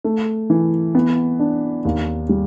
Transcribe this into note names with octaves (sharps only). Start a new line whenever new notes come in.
A3
E3
B3
D4
D#2
G3